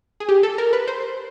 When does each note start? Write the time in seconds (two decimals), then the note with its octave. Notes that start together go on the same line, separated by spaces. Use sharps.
0.20 G#4
0.29 G4
0.43 A4
0.58 A#4
0.73 B4
0.88 C5